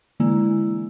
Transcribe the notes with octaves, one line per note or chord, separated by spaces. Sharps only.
D3 E3 G#3 A#3 E4